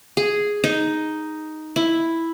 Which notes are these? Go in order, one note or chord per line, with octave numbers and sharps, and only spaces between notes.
G#4
D#4
E4